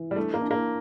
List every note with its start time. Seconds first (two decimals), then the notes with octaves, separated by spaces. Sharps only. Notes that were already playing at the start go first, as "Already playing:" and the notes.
Already playing: E3
0.11 G3
0.16 A3 D4
0.34 A#3
0.41 D4
0.51 A#3